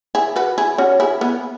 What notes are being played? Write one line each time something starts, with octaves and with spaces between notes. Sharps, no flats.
E4 G#4
F#4 B4
E4 G#4
C#4 F#4
E4 G#4
B3 E4